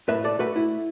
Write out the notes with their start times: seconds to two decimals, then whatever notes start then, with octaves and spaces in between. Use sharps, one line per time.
0.08 A2 B4 E5
0.24 A4 D5
0.39 A3 F#4 B4
0.56 E4